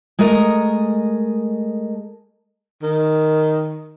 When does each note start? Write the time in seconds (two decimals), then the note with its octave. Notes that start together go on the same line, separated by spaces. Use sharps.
0.19 G#3 A3 A#4 D#5
2.83 D#3